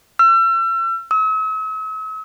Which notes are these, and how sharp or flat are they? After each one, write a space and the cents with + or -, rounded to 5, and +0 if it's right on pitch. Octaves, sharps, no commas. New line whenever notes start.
E6 +40
E6 -45